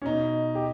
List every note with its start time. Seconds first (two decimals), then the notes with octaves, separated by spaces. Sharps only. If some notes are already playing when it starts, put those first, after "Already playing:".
0.02 C#4
0.05 B2 D#4
0.55 G4